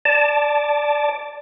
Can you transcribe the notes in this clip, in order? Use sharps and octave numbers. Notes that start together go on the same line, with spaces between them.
D5 A5